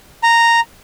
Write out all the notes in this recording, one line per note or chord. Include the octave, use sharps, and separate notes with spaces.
A#5